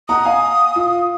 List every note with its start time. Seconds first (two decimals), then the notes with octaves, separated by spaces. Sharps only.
0.08 F#5 A#5 D#6
0.25 F5 G#5
0.75 F4